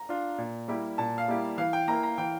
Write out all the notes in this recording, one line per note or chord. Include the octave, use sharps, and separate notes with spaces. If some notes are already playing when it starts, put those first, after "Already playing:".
Already playing: A#5
D4 F4
A#2
G3 A#3 E4 G4
A#2 A5
F5
G3 A#3 E4 G4
E3 F5
G5
A#3 E4 A#4 A#5
A#5
E3 G5